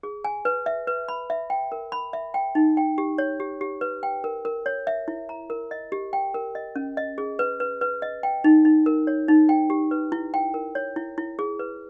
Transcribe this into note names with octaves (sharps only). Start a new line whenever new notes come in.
G#4
G#5
B4
E5
B4
B5
E5
G5
A#4
B5
E5
G5
D#4
G5
G4
C#5
G4
G4
B4
G5
A#4
A#4
C#5
E5
E4
A#5
A#4
D#5
G4
G5
A#4
D#5
C#4
D#5
G#4
B4
B4
B4
D#5
G5
D#4
D#4
A#4
C#5
D#4
G5
G4
B4
E4
G5
A#4
C#5
E4
E4
G#4
B4